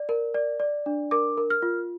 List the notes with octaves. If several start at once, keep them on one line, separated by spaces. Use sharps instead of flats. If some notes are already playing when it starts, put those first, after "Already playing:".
Already playing: D5
A#4
D5
D5
D4
A#4 D6
A#4
F6
F4